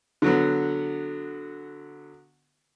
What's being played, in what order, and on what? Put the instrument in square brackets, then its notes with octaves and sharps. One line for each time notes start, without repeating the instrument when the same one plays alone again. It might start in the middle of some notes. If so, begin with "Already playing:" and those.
[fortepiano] D3 F#3 B3